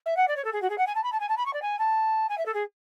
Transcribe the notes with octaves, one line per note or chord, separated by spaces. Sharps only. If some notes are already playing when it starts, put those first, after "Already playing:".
E5
F#5
D5
C#5
A4
G#4
F#4
G#4
F#5
G#5
A5
B5
A5
G#5
A5
B5
C#6
D5
G#5
A5
G#5
E5
A4
G#4